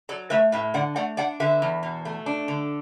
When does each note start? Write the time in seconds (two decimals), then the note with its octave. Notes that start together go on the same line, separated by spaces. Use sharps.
0.09 F#3 A4 D5
0.30 A3 B4 E5
0.52 A2 B4 E5
0.74 D3 D5 F#5
0.96 A3 D5 F#5
1.17 D4 D5 F#5
1.40 D3 B4 E5
1.62 E2
1.83 B2
2.05 A3
2.26 D4
2.48 D3